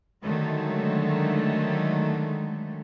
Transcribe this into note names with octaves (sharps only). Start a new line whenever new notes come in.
D3 D#3 F#3 G#3 A3